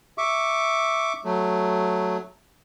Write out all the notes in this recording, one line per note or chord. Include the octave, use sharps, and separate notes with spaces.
E5 C#6 D6
F#3 A3